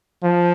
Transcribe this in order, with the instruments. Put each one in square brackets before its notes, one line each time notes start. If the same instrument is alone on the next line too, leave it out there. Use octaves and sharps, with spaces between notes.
[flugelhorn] F3